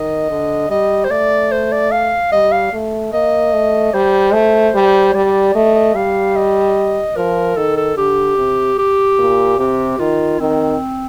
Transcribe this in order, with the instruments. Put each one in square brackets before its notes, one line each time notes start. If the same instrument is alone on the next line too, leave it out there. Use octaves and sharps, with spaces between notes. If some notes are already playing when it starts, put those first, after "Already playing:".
Already playing: [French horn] D#3 [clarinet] D#5
[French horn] D3
[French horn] G3 [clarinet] D#5
[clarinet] C5
[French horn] A3 [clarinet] D5
[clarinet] C5
D5
F5
[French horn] G3 [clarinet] D#5
[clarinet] F5
[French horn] A3
[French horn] A#3 [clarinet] D#5
[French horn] A3
[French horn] G3 [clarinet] C5
[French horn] A3
G3
[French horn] G3 [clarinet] D5
[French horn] A3 [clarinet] D#5
[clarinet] D#5
[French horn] G3 [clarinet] F5
[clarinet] D#5
[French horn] F3 [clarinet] A#4
[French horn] D#3 [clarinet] A4
[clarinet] A4
[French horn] D3 [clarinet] G4
[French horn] C3
[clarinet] G4
[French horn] A#2
[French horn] C3 [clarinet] G4
[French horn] D#3 [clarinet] F4
[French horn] D#3 [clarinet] C4